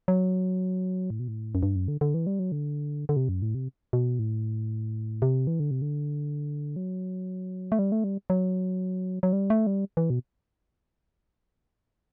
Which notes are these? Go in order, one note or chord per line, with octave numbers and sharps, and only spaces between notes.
F#3
A2
B2
A2
F#2
G2
F#2
D3
D3
E3
G3
F#3
D3
D3
C3
F#2
A2
C3
B2
A2
C3
E3
D3
C3
D3
F#3
A3
G3
A3
G3
F#3
F#3
G3
A3
G3
E3
B2